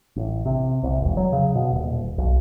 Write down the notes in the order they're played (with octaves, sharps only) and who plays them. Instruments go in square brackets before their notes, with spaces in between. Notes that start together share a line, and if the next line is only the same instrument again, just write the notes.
[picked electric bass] A1
C3
C2
E1
F#3
C#3
B2
D#1
B1